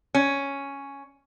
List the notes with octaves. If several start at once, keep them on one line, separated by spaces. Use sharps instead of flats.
C#4